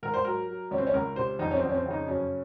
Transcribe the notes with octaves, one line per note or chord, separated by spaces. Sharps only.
G#2 A#4
C5
F#3 A#4
F#3
C#2 C#4
C4
C#4
C#2 A#4
C3 C5
F2 D#4
C#4
C4
F2
C#4
C4
C#3 D#4
F#2 C#4